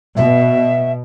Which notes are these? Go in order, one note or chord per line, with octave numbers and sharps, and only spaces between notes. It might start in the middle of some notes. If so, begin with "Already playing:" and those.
B2 E5